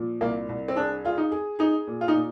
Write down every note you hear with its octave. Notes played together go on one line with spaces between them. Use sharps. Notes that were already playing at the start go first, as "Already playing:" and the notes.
Already playing: A#2 F3
C2 A#3
C2
C4
D4 G#4
F4 G#4
D#4
G#4
D#4 G#4
A#2
F4
D#4
A#2